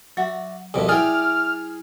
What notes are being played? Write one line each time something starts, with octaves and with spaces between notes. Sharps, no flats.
F#3 F#4 D5 E5
C2 F2 B2 E5
E4 G#4 D5 E5 G5 F6